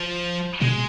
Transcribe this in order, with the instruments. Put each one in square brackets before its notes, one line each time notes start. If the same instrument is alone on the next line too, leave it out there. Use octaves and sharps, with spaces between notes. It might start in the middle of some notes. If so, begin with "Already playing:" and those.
Already playing: [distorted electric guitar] F3
[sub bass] B2 [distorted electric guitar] G#3